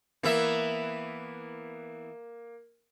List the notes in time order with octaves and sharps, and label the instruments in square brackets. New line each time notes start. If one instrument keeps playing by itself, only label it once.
[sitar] E3 B3 E5 [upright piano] A#3